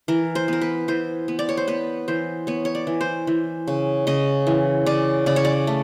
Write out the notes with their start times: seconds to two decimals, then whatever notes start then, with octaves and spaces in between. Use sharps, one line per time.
0.08 E3 A#4
0.35 C5
0.48 B3 A#4
0.61 B4
0.88 E3 C5
1.28 B3
1.39 D5
1.49 C#5
1.57 C5
1.68 B3 B4
2.08 E3 C5
2.47 B3 C#5
2.65 C#5
2.75 D5
2.87 E3
3.01 C5
3.27 E3
3.67 C#3
4.07 C#3 D#5
4.47 E3
4.86 C#3 D5
5.26 C#3 D5
5.36 C#5
5.45 D5
5.67 A3